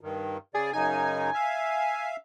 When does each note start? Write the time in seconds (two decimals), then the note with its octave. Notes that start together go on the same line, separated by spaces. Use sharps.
0.01 G2 D#3
0.54 C#3 G#4 D5
0.73 F#2 C#3 D#4 G#5
1.34 E5 F5